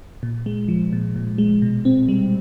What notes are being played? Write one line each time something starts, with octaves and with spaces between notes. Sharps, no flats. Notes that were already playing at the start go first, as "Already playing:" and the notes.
A#2
G#3
F3
A#2
A#2
G#3
B2
C4
G3